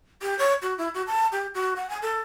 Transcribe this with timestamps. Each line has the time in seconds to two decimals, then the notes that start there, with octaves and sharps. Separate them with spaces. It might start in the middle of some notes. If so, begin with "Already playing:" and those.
0.22 G4
0.39 C#5
0.62 F#4
0.78 E4
0.94 F#4
1.07 A5
1.32 G4
1.55 F#4
1.76 F#5
1.90 G#5
2.02 A4